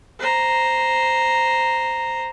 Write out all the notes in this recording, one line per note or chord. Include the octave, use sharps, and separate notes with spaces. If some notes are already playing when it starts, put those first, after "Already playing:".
C5 A#5